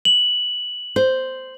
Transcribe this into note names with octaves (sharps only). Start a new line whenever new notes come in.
F#7
C5